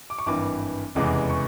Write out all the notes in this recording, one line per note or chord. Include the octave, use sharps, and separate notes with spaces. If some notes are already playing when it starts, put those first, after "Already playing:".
D6
C#6
G#1 G2 E3 D6
F1 E2 C#3 E3 G#3 D6
C#6